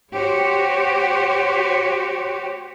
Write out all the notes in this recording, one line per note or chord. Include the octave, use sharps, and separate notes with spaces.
F#4 G4 C5 C#5